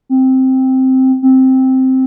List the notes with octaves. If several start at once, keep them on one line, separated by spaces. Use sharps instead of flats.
C4
C4